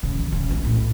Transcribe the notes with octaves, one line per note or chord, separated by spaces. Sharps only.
C#3
D#3
C#3 C#4
B1
A2